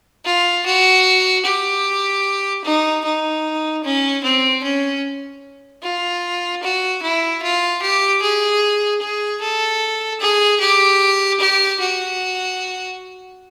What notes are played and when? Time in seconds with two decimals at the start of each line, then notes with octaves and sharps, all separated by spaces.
0.25 F4
0.66 F#4
1.45 G4
2.65 D#4
3.04 D#4
3.84 C#4
4.24 C4
4.63 C#4
5.83 F4
6.63 F#4
7.02 E4
7.43 F4
7.82 G4
8.22 G#4
9.01 G#4
9.41 A4
10.20 G#4
10.60 G4
11.40 G4
11.80 F#4